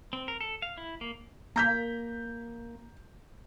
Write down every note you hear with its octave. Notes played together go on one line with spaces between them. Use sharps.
C4
A#4
A4
F5
E4
A#3
A#3 A#5 G6 B6